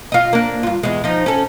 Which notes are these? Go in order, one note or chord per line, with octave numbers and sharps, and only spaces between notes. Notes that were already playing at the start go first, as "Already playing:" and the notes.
F4 D#5
A#3 D4
G2 F4
E2 G#3
F3 D#4
C#4 A4